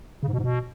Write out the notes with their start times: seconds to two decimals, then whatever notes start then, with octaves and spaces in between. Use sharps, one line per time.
0.23 C#3
0.28 G#2
0.33 B2
0.38 G#2
0.44 B2